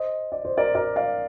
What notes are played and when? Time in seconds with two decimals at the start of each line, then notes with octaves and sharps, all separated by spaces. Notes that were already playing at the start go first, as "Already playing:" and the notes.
Already playing: C5 D#5
0.32 D5
0.45 C5
0.58 A#4 D5
0.75 A#4 D5
0.96 D5 F5